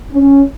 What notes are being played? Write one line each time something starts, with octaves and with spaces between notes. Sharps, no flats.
C#4